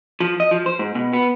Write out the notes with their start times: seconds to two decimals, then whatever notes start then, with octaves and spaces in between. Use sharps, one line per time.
0.20 F3
0.40 D#5
0.51 F3
0.66 C5
0.79 G#2
0.95 B2
1.13 B3